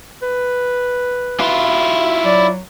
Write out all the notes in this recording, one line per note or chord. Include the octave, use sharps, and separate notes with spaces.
B4
E4 F4
F#3 D5